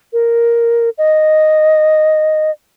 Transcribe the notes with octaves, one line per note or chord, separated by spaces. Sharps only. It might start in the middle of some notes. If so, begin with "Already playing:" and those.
A#4
D#5